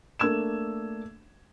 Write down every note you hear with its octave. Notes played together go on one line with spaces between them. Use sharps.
A3 A#3 D4 E6 G#6 E7